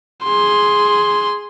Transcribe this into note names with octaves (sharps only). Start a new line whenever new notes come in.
G#4 C6